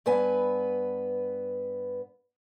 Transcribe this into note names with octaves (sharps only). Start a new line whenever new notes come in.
G2 B3 B4 G#5